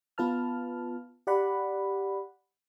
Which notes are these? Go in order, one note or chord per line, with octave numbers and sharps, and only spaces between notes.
B3 F4 B4 A5 F6
G4 D5 F#5 B5